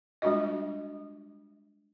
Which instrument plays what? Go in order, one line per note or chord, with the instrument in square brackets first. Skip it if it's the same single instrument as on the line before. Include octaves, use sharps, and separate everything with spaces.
[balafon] G3 G#3 D4 F4 F#4 D#5